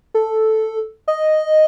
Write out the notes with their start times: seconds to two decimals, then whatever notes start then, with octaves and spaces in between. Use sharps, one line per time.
0.14 A4
1.08 D#5